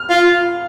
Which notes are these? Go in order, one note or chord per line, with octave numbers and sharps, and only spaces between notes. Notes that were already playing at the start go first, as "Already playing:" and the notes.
Already playing: F6
F4